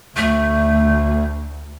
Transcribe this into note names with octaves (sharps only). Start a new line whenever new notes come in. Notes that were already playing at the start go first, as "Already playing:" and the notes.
D2 A3